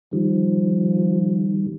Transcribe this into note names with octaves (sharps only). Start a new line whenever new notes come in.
D#3 F3 G3